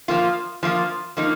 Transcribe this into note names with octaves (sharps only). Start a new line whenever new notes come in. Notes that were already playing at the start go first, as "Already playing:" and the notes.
F3 A#3 F4
F3 A#3 F4
F3 A#3 D#4